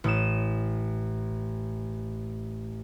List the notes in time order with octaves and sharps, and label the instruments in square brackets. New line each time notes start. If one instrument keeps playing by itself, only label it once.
[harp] A1 D#6 E7